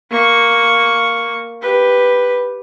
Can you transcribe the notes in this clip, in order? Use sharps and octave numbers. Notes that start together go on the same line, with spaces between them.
A#3 C#6
G4 B4